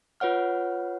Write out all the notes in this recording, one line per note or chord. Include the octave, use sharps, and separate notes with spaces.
F4 B4 C#5 F#5 F6